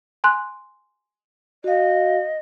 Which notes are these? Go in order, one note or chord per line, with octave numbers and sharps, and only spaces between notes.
G#5 C6 F#6
F#4 D#5 F5